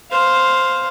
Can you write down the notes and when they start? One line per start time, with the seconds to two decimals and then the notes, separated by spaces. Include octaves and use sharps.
0.11 C5 F5